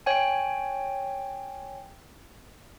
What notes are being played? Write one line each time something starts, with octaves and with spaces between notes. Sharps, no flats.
C#5 G5 G#5